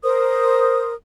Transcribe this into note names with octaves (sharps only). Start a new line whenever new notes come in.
A#4 C5 D#6